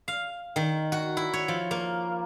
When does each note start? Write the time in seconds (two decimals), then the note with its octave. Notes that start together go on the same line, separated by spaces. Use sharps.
0.08 F5
0.56 D#3
0.92 F#4
1.17 E4
1.33 C#5
1.48 F3
1.71 A#3